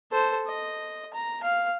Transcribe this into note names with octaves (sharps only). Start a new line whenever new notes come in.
A4 C5
D#5
A#5
F5